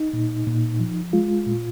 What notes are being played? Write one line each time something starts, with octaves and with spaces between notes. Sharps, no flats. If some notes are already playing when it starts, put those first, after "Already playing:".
Already playing: D#4
A#2
A#2
F3
G#3 F4
A#2